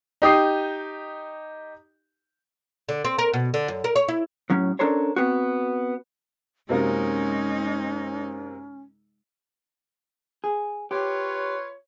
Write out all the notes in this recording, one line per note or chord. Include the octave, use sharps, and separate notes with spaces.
D#4 G4 D#6 C7
D3
C4
A#4
B2
D3
F#2
A#4
C#5
E4
A2 F#3 C#4
C#4 D4 A4 A#4 C5 C#5
B3 C4 F#4
F#2 C3 G#3 A#3 C#4 D#4
G#4
F4 G4 B4 C#5